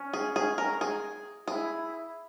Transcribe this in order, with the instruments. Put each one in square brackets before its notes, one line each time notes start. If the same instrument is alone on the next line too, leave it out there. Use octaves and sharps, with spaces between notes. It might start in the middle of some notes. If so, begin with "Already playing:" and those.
Already playing: [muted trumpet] C#4
[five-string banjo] G#4
G#4
A#4
G#4
[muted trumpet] E4 [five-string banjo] G#4